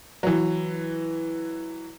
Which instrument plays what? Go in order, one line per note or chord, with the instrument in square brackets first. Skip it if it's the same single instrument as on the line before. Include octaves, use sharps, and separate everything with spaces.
[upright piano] E3 F#3